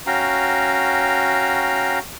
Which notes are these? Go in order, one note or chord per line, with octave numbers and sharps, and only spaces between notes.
C#4 F#4 F5 G5 A#5